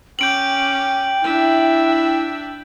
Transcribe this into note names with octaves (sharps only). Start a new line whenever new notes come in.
C#4 G5 D6 G6 D7 F#7
D4 E4 E5